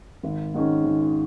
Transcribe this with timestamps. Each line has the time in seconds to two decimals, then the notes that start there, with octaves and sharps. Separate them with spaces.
0.23 G#1
0.54 G#2 D#3 G#3 C#4
0.84 G#1